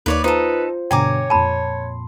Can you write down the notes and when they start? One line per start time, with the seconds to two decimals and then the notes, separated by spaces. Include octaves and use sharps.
0.06 D#2 A#3 D#4 B4 C#5 D5
0.24 D#4 F4 A4 B4 C5
0.91 G2 B2 D3 C#5 G5 G#5 A#5 D6
1.30 F2 A#2 A5 B5 C6